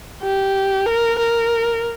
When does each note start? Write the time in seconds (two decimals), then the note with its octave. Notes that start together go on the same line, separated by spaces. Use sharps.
0.23 G4
0.86 A#4
1.19 A#4